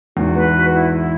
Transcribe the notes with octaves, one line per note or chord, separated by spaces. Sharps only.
E2 G#2 F#4
B4
F#4
E4
E4